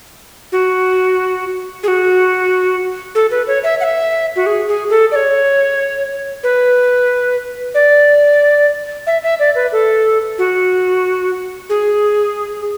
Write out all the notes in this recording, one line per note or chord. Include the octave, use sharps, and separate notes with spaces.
F#4
G#4
F#4
A4
B4
C#5
E5
F#5
E5
F#4
G#4
G#4
A4
D5
C#5
B4
D5
E5
E5
D5
B4
A4
F#4
G#4